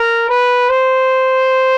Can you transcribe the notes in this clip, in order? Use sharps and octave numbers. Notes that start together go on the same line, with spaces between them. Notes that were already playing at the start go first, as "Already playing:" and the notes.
Already playing: A#4
B4
C5